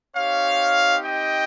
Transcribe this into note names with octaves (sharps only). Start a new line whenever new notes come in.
C4 D#4 G4 C#5 F5
D#5 G5